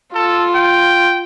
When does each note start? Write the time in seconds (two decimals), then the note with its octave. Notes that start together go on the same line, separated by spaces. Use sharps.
0.15 F4 A4
0.55 G5